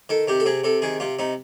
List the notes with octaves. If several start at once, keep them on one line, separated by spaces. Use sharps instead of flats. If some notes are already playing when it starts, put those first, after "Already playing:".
D#3 A4
C3 G4
A4
C3 G#4
C3 A4
D#3 G#4
C3 F4
C3 D#4